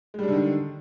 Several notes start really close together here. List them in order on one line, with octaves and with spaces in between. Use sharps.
G#3 G3 D4 D3 D#3